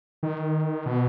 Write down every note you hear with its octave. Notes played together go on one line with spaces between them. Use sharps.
D#3
B2